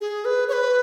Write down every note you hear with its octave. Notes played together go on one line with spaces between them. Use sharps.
G#4
B4
C#5
B4